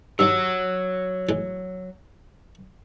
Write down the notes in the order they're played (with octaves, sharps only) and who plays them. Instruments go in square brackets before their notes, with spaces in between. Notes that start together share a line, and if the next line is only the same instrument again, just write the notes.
[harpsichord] G2 D#3 [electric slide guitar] F#3 C#5 F#5 [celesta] E6
[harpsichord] A2 E3 G#3